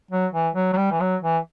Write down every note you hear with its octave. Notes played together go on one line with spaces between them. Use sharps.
F#3
E3
F#3
F#3
G3
E3
F#3
E3